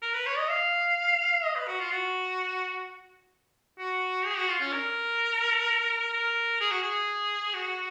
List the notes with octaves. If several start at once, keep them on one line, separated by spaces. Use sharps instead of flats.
A#4
B4
C#5
D#5
F5
D#5
B4
F#4
F4
F#4
F#4
G#4
F#4
F4
C#4
A#4
A#4
G#4
F#4
G#4
F#4